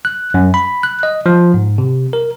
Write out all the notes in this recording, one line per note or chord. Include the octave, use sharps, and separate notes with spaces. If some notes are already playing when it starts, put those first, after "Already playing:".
F#6
F#2
B5
F#6
D#5
F3
G#2
C3
A#4